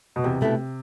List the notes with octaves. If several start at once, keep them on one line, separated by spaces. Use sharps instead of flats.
B2
E2 C3
B2 A3 E4 B4